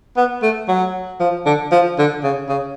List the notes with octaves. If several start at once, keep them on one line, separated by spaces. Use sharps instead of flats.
B3
A3
F#3
F3
D3
F3
D3
C#3
C#3